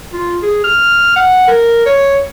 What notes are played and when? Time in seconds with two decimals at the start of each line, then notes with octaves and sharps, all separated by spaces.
0.13 F4
0.42 G#4
0.64 F6
1.16 F#5
1.48 A#4
1.86 C#5